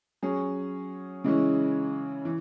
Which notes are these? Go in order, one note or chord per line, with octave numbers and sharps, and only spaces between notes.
F#3 C#4 G#4
C#3 E3 G#3 C#4 E4
E3